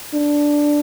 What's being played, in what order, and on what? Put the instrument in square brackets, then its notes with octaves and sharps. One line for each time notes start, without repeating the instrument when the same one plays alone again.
[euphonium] D4